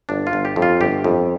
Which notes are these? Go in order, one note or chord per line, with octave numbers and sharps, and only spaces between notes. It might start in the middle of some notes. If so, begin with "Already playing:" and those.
G1 D4
F4
G1
G4
F2
F4
G1 G4
F2